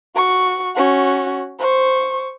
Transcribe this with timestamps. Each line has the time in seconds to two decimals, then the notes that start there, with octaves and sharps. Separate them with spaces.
0.16 F#4 C#6
0.76 C#4 F#4
1.59 C5 C#6